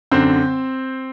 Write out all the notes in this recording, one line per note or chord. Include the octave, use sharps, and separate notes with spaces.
F#2 D3 C4 C5